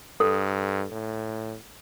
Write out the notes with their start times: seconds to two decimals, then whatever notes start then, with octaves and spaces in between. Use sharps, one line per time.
0.20 G2 A4
0.92 A2